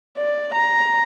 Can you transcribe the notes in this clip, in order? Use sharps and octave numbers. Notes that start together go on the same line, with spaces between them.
D5
A#5